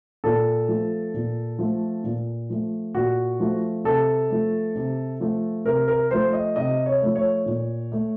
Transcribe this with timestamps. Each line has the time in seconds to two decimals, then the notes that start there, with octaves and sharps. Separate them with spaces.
0.24 A#2 A4
0.68 F3 A3
1.14 A#2
1.59 F3 A3
2.04 A#2
2.50 F3 A3
2.94 A#2 F#4
3.40 F3 A3
3.84 C3 A4
4.30 F3 A3
4.75 C3
5.20 F3 A3
5.65 C3 A#4
5.88 A#4
6.11 F3 A3 C5
6.33 D#5
6.56 C3 D#5
6.86 C#5
7.02 F3 A3
7.15 C#5
7.46 A#2
7.92 A3